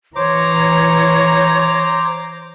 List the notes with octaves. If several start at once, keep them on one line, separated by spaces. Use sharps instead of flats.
E3 C5 C#5 A#5 D6